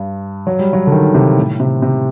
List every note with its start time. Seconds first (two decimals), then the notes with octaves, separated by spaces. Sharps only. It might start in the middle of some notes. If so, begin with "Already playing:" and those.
Already playing: G2
0.47 F#3
0.59 G3
0.73 F#3
0.87 D3
0.92 D#3
1.15 C3
1.38 A2
1.60 C3
1.82 C3